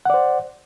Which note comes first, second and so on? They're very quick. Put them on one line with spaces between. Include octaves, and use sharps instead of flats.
F#5 D5 C5